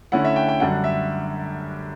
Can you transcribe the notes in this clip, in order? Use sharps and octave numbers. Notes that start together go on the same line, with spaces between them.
D3 A3 C#4 E4 F#5
E5
G5
G5
F#2 D3 G3 D4 F#5
E5